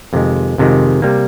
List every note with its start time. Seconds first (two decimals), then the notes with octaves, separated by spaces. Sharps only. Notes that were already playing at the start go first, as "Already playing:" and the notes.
0.13 F2 C3 D#3 G#3
0.58 F2 C3 D#3 G#3
1.02 C3 G3 A#3